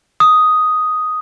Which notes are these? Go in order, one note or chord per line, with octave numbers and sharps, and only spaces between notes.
D#6